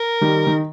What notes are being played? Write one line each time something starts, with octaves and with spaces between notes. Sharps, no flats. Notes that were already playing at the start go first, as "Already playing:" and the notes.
Already playing: A#4
D#3 G3
D#3